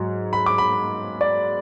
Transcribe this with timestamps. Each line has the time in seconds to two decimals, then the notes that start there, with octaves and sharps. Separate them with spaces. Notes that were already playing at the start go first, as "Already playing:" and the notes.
Already playing: G#2 F#3
0.33 B5
0.46 D6
0.58 B5
1.21 D5